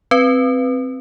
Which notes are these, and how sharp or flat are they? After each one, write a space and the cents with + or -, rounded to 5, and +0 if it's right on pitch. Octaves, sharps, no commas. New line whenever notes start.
C4 +0 B4 +0